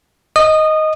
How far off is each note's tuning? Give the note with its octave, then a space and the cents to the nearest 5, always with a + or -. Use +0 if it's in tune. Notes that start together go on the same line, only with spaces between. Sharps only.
D#5 +5 D#6 -20